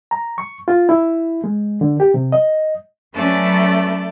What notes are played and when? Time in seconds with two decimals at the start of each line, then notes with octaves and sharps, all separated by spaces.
0.11 A#5
0.38 C#6
0.68 F4
0.89 E4
1.44 G#3
1.81 D3
2.00 G4
2.14 C3
2.32 D#5
3.14 F#3 A3 C#4 B4 D5